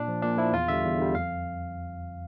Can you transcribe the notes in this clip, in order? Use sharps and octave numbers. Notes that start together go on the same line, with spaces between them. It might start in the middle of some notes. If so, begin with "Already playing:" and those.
Already playing: A#2 D4
F3
A#2 D4
F3 E4
E2 F4
D3 G3 E5
E2
D3 G3
F2 F5